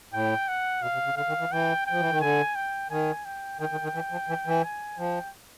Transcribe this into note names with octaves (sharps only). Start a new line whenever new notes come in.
A2 G5
F#5
B2 F5
C3
C#3
D3 F5
D#3
E3
E3 G5
F3 G5
E3
D#3
D3 G#5
G5
D#3 G#5
G5
D#3 G5
D#3
D#3
E3
F3
E3
E3
G#5
F3 G5